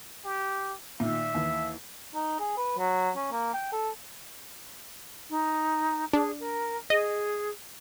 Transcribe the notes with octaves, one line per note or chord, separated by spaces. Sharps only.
G4
A#2 D#3 E5
D#2 E3
D#4
G#4
B4
F#3
C#4
A#3
G5
A4
D#4
D4 G#4
A#4
G#4 D#5